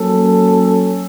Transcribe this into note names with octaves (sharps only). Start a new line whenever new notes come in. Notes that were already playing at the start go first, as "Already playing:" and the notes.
Already playing: F#3 A#3 C#4 A4